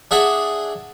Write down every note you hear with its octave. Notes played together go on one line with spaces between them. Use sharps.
D4 G#4 E5 F#5